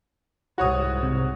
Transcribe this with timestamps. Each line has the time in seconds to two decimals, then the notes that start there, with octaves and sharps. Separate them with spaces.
0.58 C2 G#2 F#4 C#5 F#5 D#6
1.03 C3